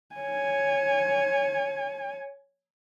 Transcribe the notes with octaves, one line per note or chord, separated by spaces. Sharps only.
C#5 G#5